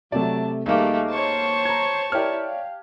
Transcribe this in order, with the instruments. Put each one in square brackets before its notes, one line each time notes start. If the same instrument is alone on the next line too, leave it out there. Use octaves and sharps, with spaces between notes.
[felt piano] C3 A3 [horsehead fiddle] F#3 A5 [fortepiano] D5
[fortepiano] D#2 A#3 [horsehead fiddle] G3 F5 [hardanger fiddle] A3 [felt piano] D#4 G#4
[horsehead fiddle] C5 C#5 [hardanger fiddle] A5 C#6
[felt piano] A#5 G#6
[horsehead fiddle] E4 A#4 [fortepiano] G4 F6 [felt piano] C#5 D5
[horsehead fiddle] F5